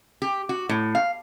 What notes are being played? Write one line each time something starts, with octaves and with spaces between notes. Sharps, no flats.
G4
F#4
A2
F5